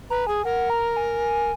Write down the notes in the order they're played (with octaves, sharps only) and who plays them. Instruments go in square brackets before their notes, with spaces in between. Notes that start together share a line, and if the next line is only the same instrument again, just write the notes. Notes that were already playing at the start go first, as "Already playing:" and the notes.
[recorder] B4 [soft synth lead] A#5
[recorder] G#4 [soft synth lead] G#5
[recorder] A#4 [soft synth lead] F#5
[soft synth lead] A#5
G#5